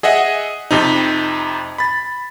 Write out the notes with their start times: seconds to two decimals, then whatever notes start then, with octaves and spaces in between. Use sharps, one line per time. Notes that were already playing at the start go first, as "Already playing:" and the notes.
0.03 G#4 D#5 E5 F#5
0.71 F2 C3 D#4
1.78 B5 A6